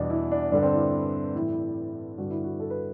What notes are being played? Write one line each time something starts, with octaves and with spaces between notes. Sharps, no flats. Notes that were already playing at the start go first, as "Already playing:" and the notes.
Already playing: E2 B2 G3 D4
E4
D4
G2 D3 G3 D4
C4
E4
A2 E3 G3 E4
G2 D3 G3 F#4
E4
F#4
A4
B4